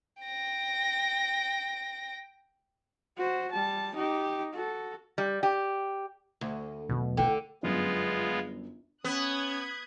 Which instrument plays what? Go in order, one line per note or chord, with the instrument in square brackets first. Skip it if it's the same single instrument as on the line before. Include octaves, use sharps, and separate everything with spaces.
[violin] G5 A#6
[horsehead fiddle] F#4 C5
G3 A5
D#4 G4
F#4 A4
[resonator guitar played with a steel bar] G3
G4
[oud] D2
[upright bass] D#2 F#3 [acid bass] B2
[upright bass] D2 E4 [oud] D3 [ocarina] G5
[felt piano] G1 F#2 [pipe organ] G#3 B3 F4
[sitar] B3 [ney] C#4 [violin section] D#6 F#6 G#6